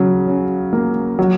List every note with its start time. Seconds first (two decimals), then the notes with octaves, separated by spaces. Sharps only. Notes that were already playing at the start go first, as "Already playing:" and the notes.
Already playing: C#3 F#3
0.27 C#4
0.73 A#3
1.19 F#3